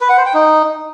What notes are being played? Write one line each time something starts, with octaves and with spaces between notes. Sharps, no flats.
B4
F#5
C5
G5
D#4